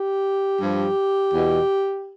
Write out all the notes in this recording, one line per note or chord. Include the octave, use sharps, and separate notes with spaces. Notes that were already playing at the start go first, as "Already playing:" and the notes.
Already playing: G4
G2 F3
E2 B2